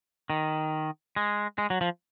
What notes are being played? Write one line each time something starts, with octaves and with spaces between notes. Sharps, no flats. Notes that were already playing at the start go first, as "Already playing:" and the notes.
D#3
G#3
G#3
F#3
F3